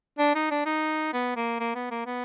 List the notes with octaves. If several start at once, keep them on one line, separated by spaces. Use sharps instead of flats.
D4
D#4
D4
D#4
B3
A#3
A#3
B3
A#3
B3